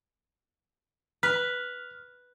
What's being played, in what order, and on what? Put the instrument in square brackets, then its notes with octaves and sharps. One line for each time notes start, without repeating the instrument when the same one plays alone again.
[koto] B4 [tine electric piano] F6